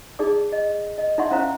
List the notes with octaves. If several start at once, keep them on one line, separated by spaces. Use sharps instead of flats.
D#4 G#4 D5 D6
D#5
D#5
D#4 D5 E5 F#5 C6 C#6
C#4 E4 C5 F5 A#5